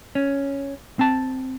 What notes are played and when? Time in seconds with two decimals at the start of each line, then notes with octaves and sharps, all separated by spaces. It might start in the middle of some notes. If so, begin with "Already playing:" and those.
0.15 C#4
0.99 C4 A5